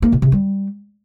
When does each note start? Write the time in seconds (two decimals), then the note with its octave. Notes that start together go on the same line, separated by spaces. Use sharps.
0.02 A#3
0.12 B2
0.22 C3
0.32 G3